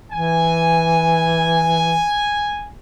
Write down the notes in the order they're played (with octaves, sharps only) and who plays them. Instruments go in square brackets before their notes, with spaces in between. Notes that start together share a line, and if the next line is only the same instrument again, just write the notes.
[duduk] E3 [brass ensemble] G#5